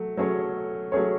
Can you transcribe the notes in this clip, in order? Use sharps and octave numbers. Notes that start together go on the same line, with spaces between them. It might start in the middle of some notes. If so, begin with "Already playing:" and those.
Already playing: F#3 A3
F#3 A3 C#4 G#4 C#5
F#3 A3 C#4 G#4 C#5